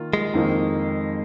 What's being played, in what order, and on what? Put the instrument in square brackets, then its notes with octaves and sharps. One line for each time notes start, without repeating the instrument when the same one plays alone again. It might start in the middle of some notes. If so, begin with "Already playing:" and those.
Already playing: [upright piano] D#3 A#3 F4
[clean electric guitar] G#3
[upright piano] F2 D#3 A#3 D#4